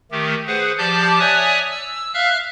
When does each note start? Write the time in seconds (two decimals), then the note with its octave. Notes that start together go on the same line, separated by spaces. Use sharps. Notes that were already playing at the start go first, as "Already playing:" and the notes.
0.11 D#3 A3 G4
0.47 G#4 B4 C5 F#5
0.78 F3 G4 D5 A5 D6 G6
1.19 C#5 D5 E5 G#5 D#6 F#6
1.71 E6
2.14 E5 F5 F6 F#6